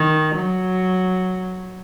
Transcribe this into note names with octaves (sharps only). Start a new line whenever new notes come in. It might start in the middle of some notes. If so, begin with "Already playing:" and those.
Already playing: D#3
F#3